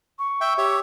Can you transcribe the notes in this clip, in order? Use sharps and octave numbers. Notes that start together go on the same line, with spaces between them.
C#6
E5 G5
G4 C#5 E5